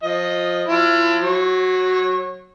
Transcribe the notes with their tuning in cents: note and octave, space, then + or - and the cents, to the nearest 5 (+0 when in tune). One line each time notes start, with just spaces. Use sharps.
F3 +15 D#5 +0
F3 +35 E4 +40
F#3 +0 C#5 -25